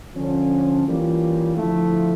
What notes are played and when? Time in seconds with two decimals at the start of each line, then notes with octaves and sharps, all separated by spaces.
0.14 D3 F3 C#4
0.86 E3 G3 A#3 C#4 F4
1.56 D3 F3 A3 E4